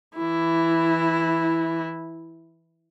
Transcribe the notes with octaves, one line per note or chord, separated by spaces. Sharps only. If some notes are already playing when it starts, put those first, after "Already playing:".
E3 E4